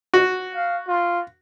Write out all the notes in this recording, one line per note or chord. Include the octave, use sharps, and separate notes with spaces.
F#4
F5
F4